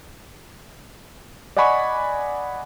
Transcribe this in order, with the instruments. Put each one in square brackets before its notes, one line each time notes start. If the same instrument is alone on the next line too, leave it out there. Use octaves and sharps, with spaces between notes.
[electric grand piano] D5 D#5 F#5 G#5 B5 C#6